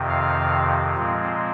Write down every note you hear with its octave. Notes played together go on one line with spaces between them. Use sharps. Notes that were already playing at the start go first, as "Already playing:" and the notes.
Already playing: F2 C3 D#3
F5
A#2 F3 G#3 C4